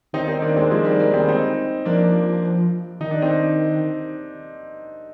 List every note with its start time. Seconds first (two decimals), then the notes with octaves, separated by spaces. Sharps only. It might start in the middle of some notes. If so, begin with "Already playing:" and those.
0.13 D#3 C4 D#4
0.28 C4 D#4
0.42 A#3 D4
0.56 G#3 C4
0.71 F3 G#3
0.85 G3 A#3
1.00 G3 A#3
1.14 G#3 C4
1.28 C4 D#4
1.85 F3 A#3 D4
3.00 D#3 D#4
3.11 D4
3.22 C4 D#4